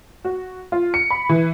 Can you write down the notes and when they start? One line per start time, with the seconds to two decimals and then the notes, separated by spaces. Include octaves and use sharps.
0.25 F#4
0.72 F4
0.94 C#7
1.11 B5
1.29 E3